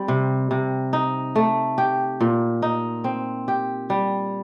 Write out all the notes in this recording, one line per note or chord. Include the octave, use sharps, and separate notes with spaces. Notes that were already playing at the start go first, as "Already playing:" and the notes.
Already playing: G3 C4
C3
C3
D#4
A3
G4
A#2
D#4
C4
G4
G3